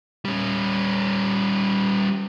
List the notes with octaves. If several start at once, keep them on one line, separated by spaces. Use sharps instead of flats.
G3 C#4